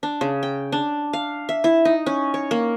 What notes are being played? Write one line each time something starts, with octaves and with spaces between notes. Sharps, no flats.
D4
C#3
G5
D4
F5
E5
E4
D#4
C#4
C#5
A#3